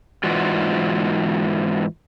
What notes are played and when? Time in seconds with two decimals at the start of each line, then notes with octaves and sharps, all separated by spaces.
0.24 G#2 E3 F4 F#4 D5